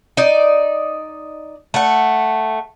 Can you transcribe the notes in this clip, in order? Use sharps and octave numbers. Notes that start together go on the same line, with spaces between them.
D#4 D5
A3 F#5